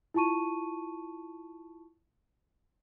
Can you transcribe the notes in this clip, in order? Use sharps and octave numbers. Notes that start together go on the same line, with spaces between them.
E4 F4 A5 C#6 D#7